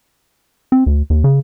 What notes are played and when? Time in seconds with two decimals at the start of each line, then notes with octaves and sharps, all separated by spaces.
0.72 C4
0.86 D2
1.10 D#2
1.24 C#3